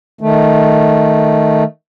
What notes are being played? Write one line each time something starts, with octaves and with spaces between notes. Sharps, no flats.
D#3 A3